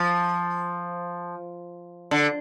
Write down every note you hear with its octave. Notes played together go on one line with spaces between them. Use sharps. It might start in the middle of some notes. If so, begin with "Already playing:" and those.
Already playing: F3
D3